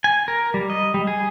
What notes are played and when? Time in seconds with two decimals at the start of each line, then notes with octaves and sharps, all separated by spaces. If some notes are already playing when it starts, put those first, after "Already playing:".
0.04 G#5
0.28 A#4
0.54 G3
0.70 D#5
0.94 G3
1.07 G#4